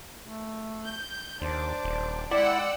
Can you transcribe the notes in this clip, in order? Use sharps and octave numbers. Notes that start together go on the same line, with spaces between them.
A3
G6
D#2 D4 C5 D6
D#1
G#3 E4 D5 F#5 G5 E6